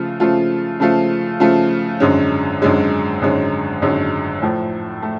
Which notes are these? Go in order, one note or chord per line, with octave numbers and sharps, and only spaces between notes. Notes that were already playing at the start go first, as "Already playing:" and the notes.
Already playing: C#3 F3 A3 F4
C#3 F3 A3 F4
C#3 F3 A3 F4
C#3 F3 A3 F4
G#1 F#2 D3 G#3 C#4
G#1 F#2 D3 G#3 C#4
G#1 F#2 D3 G#3 C#4
G#1 F#2 D3 G#3 C#4
A2 F3 A3
A3